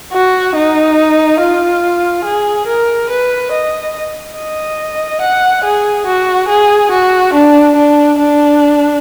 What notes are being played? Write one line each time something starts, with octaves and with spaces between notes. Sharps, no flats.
F#4
D#4
F4
G#4
A#4
B4
D#5
D#5
F#5
G#4
F#4
G#4
F#4
D4
D4
D4